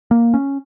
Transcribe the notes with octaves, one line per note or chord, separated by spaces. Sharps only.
A#3
C#4